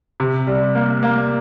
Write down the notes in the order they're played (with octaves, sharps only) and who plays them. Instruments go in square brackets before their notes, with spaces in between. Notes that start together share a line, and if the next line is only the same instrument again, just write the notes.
[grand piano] C3
G3
A#3
A#3